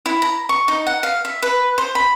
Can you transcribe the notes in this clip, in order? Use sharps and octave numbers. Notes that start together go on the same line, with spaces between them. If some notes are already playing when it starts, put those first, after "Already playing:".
E4
A#5
C#6
D#4
F#5
F5
E5
B4
C5
B5